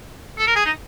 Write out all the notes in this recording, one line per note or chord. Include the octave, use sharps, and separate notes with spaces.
A4
A#4
G#4
D#4